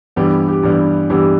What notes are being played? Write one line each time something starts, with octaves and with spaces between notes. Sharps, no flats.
G2 E3 G3 B3 G4
G4
G2 E3 G3 B3
G2 E3 G3 B3 G4